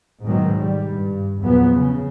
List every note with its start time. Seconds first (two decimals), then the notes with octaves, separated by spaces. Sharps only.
0.23 G#2 B2 D#3 F#3
0.58 G3
0.91 G2
1.41 E2 A#2 F3 F#3 B3
1.73 C#3